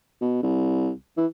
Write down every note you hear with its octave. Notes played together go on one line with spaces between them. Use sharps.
B2
C2
E3